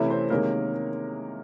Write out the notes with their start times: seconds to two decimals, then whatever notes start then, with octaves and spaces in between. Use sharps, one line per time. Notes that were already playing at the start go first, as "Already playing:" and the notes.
Already playing: C3 E3 A3 C#4 E4 E5
0.10 C4 C5
0.30 C3 D#3 G#3 A#3 C#4 A#4